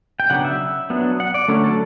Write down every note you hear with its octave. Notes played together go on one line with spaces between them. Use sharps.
G5
C#3 F#3 B3 D4 F#5
E5
F#3 B3 D4
F#5
D5
D3 F#3 A3 C#4
A4